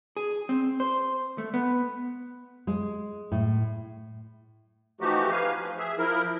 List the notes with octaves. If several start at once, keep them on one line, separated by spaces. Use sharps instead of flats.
G#4
C4
C5
A3
B3
G#3
A2
E3 F3 A3 D#4 F#4 G4
B4 F5 G#5
F3
G#4 E5
F3 E4 A#4